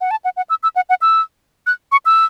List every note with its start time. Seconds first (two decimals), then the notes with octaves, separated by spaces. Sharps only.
0.01 F#5
0.11 A5
0.24 F#5
0.37 F#5
0.50 E6
0.63 E6
0.76 F#5
0.89 F#5
1.01 E6
1.67 F#6
1.92 C#6
2.05 E6